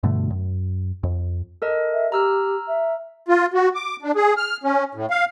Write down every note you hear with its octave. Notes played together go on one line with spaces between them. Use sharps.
G2 B2 D3 A3
F#2
F2
A4 A#4 D#5
E5
G4 A#5 E6 F6
E5
F4
F#4
D6
D4
G#4
F6
C#4
A2
F5